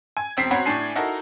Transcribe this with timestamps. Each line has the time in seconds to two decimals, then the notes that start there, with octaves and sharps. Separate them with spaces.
0.17 G#5
0.37 E1 C4 B6 C7
0.51 C4 F#4 C#5 F#5 A#5 B5
0.65 A2 D4 G#5 C7
0.96 D#4 E4 F#4 A4 A#4 E5